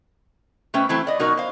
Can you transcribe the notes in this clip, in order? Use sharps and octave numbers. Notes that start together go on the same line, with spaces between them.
B2 A3 C#4 B4 C5 G5
E3 F#3 A3 C4 E4
D5 D#5
B2 F#3 D#4 F#4 A#4
C5 F5